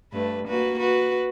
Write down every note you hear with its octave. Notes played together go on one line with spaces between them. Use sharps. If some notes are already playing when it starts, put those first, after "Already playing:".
G2 A3 B4
A#3 F#4 B4
F#4 B4